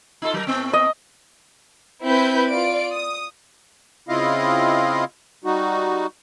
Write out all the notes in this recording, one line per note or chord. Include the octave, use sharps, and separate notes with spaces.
D#4 F4 A4
F#3 A#4
A2 B3 C4
D#5
C4 E4 B4 B5 G6
F4 D5 D7
D#6
C#3 C4 E4 F4 D#5 F5
G3 D#4 F#4